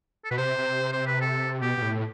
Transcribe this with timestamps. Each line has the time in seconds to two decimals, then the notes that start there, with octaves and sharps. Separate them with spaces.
0.25 A4
0.31 B2 B4
0.38 C3 C5
0.58 C3
0.93 C5
1.06 B4
1.21 A4
1.62 B2 G4
1.77 B2
1.82 A2